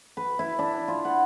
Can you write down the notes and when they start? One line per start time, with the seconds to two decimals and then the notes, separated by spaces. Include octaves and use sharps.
0.17 B4
0.39 E4
0.59 D4
0.88 F4
1.05 F#5